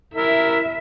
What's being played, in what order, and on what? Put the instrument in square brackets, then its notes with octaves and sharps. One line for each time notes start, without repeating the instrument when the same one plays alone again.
[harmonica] E4 A#4 [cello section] E5